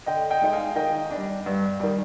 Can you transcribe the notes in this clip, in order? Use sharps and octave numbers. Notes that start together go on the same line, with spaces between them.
D3 D#5 G5
D#5 G5
G#3 D#4
F5 G#5
D#3 D#5 G5
D4
G3
G2
D#3 G3